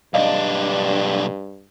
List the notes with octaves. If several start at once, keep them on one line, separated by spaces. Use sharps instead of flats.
B1 G2 D4 D5 D#5 F5